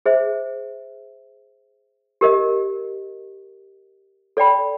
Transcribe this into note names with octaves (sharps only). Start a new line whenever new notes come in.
G#4 C5 E5
G4 A#4 D#5
A4 D5 G5 B5